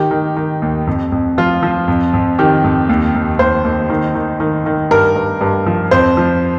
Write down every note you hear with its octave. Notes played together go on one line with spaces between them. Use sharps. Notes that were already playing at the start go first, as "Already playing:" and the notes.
Already playing: D#3 G4
D#3
D#3
D#2
F2
F2
F3 F4
F3
F2
F2
D#3 G4
F2
D#2
D#2
D#2 C5
D#2
D#3
D#3
D#3
D#3
G2 A#4
G2
G2
F3
F2 C5
F3